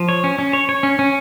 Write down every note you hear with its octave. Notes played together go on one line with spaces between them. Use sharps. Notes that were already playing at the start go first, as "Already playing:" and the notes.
Already playing: F3
C#5
C#4
C#4
C#5
C#5
C#4
C#4